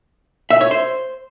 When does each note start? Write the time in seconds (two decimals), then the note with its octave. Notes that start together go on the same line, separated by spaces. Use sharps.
0.50 E5
0.61 C#5
0.71 C5